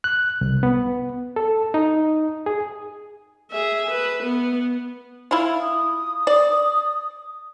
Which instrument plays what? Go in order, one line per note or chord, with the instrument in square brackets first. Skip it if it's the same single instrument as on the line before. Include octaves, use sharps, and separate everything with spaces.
[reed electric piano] F#6
C2
B3
A4
D#4
G#4
[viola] G#4 E5
B4
B3
[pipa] E4 F4
[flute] D#6
[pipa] D5